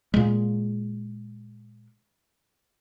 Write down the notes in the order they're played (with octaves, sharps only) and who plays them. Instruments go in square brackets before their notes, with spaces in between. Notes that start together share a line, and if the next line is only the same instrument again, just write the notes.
[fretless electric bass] A#2 G#3